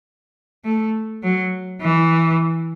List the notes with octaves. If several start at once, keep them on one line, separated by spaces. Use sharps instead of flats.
A3
F#3
E3